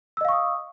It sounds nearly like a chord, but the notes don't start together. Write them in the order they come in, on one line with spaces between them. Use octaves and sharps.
E6 D#5 F5 C#6 D#6